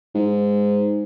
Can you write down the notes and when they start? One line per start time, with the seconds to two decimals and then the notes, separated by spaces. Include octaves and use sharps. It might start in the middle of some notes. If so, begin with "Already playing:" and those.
0.15 G#2